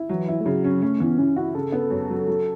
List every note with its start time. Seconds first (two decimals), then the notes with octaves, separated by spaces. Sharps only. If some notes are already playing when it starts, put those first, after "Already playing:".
Already playing: E4
0.09 E3 F#3
0.28 E4
0.41 A3
0.45 C#3 F#3
0.64 C#4
0.82 A3 C#4
1.00 E3 B3
1.18 E3 C#4
1.36 E4 F#4
1.55 C#3 A4
1.72 B3
1.91 F#2
2.10 F#3
2.27 F#3